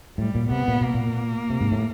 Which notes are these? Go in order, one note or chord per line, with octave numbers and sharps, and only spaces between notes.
A2 G3
A#2
C3 B3
A#2
B2 A#3
A#2
C3
G#2
A2